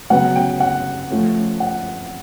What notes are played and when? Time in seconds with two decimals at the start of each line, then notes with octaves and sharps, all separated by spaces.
0.10 C#3 F#3 B3 F#5
0.36 G5
0.60 F#5
1.10 F3 A3 C#4
1.60 F#5